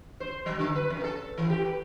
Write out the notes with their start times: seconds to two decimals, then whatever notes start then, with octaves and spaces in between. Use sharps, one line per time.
0.20 C5
0.46 F#3
0.59 D3
0.75 B4
0.90 F2
1.04 A4
1.38 E3
1.50 G4
1.65 B4